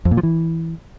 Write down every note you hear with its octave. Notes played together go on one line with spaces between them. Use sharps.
F2
A#2
F3
E3